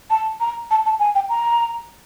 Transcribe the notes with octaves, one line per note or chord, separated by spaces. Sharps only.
A5
A#5
A5
A5
G#5
G5
A#5